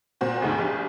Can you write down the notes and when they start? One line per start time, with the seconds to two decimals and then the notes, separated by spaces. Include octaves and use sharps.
0.21 A#2 C4 F#4
0.42 D2 G#2 B2
0.58 A#1 G4